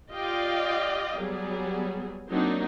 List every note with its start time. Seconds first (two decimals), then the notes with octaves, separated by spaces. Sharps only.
0.11 F4 G4 D5 D#5 F5 G5
1.18 F#3 G3 B3 G#4
2.29 F#3 A#3 C4 D4 D#4